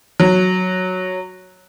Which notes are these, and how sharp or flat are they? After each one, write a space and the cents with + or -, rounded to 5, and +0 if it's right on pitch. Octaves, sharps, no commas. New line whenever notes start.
F#3 -5